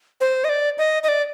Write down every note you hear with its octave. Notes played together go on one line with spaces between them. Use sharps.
C5
D#5
D5
D#5
D#5
D5